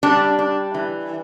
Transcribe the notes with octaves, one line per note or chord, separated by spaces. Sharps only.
G3 D4
D4
E3